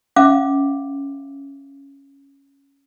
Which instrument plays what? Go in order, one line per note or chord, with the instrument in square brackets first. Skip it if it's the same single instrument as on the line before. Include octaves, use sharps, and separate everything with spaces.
[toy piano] C#4 E5 F5 D6